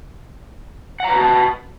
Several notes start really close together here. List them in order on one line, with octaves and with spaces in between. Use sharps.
F#5 A#5 B4 F#4 A5